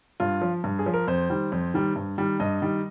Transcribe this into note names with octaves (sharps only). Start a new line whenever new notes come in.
G2 F4
F3
G2
G#4
F3
A#4
F2 C5
D#3 G3
F2
D#3 G3
G2
D#3 G3
G2 D#5
D#3 G3